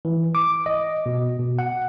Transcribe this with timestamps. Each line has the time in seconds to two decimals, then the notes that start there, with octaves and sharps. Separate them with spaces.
0.05 E3
0.35 D6
0.66 D#5
1.06 B2
1.39 B2
1.59 F#5